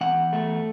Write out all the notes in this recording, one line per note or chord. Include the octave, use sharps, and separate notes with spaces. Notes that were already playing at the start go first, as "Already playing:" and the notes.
E2 F#5
A3